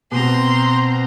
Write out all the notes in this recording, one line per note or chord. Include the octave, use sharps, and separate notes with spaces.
B2 C4 A#5 C6